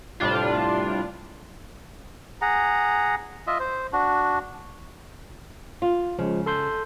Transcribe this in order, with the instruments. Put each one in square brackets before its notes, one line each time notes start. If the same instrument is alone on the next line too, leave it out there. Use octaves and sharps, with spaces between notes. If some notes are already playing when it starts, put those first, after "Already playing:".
[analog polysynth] A2 C3 G3 D4 F4
[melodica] G#4 F#5 A#5
F4 D#5 E5
C5
D4 F#4
[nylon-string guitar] F4
[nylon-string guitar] C#3 [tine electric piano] F3 G#3
[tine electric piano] A4 C6 G6